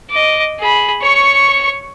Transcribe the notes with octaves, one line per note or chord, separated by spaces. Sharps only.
D#5 D6
G#4 B5
C#5 C#6